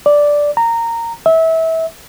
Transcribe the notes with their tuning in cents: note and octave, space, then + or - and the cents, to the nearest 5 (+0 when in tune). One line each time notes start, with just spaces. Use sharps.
D5 -5
A#5 -15
E5 -25